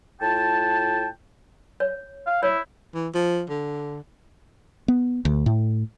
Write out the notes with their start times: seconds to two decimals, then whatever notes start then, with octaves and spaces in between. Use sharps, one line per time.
0.21 A2 F4 G5 A5
1.80 C#5
2.27 F5
2.43 E4 C#5
2.94 E3
3.14 F3
3.50 D3
4.88 B3
5.25 D2
5.46 A2